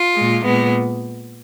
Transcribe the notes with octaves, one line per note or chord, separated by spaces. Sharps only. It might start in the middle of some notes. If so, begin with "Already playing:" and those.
Already playing: F4
A#2 G#3
A#2 G#3 B3